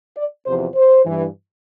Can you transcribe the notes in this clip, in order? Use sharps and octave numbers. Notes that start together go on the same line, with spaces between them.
D5
E2 C3 F3 C5
C5
G2 E3